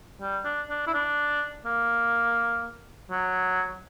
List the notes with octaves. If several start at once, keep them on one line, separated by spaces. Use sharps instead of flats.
G3
D4
D4
E4
D4
A#3
F#3